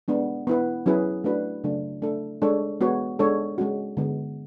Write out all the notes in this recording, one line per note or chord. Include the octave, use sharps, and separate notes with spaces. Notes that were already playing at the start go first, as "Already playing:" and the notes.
G#3 B3 D4
B3 E4 B4
F#3 C#4 E4 G#4 B4
A3 D4 F#4 B4
C#3 F#3 A3 D4
A3 D4 A4
G#3 D4 A4 C#5
G#3 B3 F#4 C#5
G#3 D4 A4 C#5
G#3 C#4 F#4
D3 G#3 B3